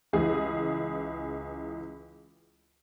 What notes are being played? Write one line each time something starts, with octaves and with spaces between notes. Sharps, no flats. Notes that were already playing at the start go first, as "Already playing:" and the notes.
C#2 E3 G#4